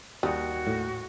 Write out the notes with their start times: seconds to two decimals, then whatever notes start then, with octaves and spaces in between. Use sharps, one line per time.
0.23 D#2 G3 F#4 D#6
0.67 A2